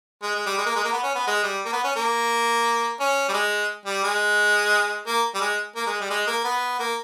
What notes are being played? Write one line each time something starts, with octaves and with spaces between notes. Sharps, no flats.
G#3
G#3
G3
G#3
A#3
G#3
A#3
B3
C#4
B3
G#3
G3
A#3
B3
C#4
A#3
C#4
G3
G#3
G3
G#3
A#3
G3
G#3
A#3
G#3
G3
G#3
A#3
B3
A#3